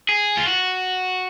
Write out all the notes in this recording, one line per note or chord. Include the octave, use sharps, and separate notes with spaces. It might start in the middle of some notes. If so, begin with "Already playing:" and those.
G#4
F4
F#4